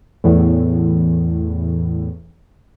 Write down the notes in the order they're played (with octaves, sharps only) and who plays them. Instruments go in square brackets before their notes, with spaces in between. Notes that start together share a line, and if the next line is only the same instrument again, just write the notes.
[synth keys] E2 A2